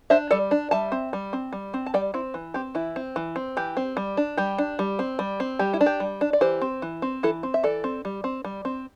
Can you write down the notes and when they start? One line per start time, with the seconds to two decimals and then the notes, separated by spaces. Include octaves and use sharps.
0.10 D4 C5 E5
0.31 G3 A4 D5
0.51 D4
0.71 G3 E5 A5
0.92 C4
1.13 G3
1.33 C4
1.53 G3
1.74 C4
1.86 A5
1.94 G3 D5 G5
2.14 C4 E4
2.34 E3
2.54 C4 G4
2.75 E3 E4
2.96 C4
3.16 E3
3.36 C4
3.57 E3 G4
3.77 C4
3.97 G3
4.17 D4
4.37 G3 G4
4.58 D4
4.79 G3
4.99 C4
5.19 G3
5.40 C4
5.59 G3 G4
5.74 E4
5.81 D4
5.86 G4
6.00 G3
6.21 D4
6.33 D5
6.41 E3 G4 C5
6.61 C4
6.82 E3
7.02 C4
7.23 E3 E4 A4
7.43 C4
7.54 E5
7.63 E3 A4 D5
7.84 C4
8.05 G3
8.24 C4
8.45 G3
8.65 C4